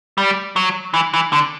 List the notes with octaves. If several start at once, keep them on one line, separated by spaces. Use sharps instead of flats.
G3
F#3
E3
E3
D3